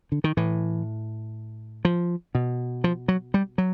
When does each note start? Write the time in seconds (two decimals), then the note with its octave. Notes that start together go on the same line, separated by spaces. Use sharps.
0.12 D3
0.24 D#3
0.37 A2 E3
1.85 F3
2.35 B2
2.84 F3
3.08 F#3
3.34 G3
3.58 F#3